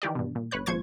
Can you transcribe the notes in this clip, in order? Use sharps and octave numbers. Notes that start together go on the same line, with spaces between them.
D#3 E3 G4 D5
G2 B2
A#2
G1 B4 C#5 F#6
G#1 A#2 F3 C5 C#6 G#6